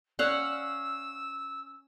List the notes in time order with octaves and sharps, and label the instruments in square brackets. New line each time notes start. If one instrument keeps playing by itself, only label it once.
[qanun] C#4 F5 F#5 [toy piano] D5 [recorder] E6